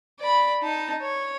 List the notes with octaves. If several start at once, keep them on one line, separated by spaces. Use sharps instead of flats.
D5 B5
D#4 A5
C#5